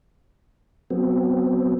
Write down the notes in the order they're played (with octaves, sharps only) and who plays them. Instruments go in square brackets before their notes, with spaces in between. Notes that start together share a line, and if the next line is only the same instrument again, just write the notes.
[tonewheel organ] F#3 B3 C4